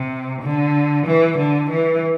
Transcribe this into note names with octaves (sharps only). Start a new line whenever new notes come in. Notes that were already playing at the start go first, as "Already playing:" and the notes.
Already playing: C3
D3
E3
D3
E3